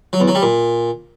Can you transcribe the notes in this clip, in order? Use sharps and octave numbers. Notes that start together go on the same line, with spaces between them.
F#3
E2
F#3
G3
A#2